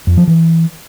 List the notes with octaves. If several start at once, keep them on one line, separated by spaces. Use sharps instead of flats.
F2
F3
E3